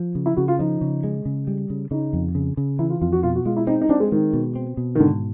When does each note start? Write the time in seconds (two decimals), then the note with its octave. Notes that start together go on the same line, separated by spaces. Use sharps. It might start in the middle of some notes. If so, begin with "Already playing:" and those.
Already playing: F3
0.15 C#3
0.26 E4
0.37 C#3 F#4
0.48 F4
0.59 F3 D#4
0.81 C#3
1.04 G#3
1.26 C#3
1.47 G3
1.70 C#3
1.91 C#3 D#4
2.13 F2
2.35 C#3
2.57 C#3
2.79 E3 E4
2.90 F4
3.01 F2 F4
3.12 F#4
3.23 B2 F4
3.35 F#4
3.46 G#3 F4
3.57 E4
3.67 C4 D#4
3.82 D#4
3.89 C4 D4
4.00 G#3
4.12 D#3 G#3
4.33 B2
4.56 C4
4.77 B2
4.95 D#3
5.00 G#2 D3